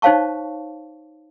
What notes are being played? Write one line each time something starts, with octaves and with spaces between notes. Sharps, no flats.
D#4 C5 C#5 F5 A5 C#6